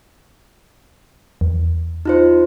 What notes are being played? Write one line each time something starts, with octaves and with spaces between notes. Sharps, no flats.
E2
D#4 F4 C5